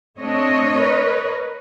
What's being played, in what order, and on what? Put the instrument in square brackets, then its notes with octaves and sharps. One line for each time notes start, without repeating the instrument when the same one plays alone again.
[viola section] A3 C4 D4 [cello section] C#5 D#5
[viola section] A#4 B4